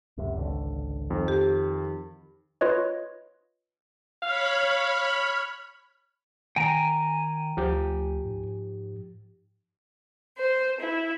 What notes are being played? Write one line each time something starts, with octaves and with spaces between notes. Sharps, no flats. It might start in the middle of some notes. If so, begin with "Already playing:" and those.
C#2 F#2 C3
G#1 C#2 D3
F2 D#3
G4
F4 B4 C#5 D#5
C#5 F5 B5 F6
D#3 G5 G#5 A#5
D2 F3 G4
G#2
C5
E4